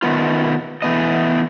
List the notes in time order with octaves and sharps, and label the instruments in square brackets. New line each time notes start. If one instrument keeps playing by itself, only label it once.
[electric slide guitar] D#3 A3 B3 F4
E3 A3 B3 D#5